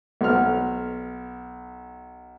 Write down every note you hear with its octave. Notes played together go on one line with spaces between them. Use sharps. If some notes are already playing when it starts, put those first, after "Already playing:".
B1 F6